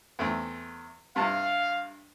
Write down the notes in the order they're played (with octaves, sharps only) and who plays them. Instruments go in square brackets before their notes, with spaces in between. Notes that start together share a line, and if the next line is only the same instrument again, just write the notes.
[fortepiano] E2 A3 C4
[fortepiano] G2 C3 A5 [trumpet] F5